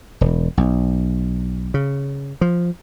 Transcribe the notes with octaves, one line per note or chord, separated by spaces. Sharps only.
E1
B1
C#3
F3